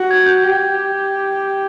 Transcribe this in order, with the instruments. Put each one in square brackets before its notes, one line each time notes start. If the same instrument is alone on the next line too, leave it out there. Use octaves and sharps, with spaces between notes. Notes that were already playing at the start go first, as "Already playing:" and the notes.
Already playing: [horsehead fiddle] F#4
[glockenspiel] G#6
G6
[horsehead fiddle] G4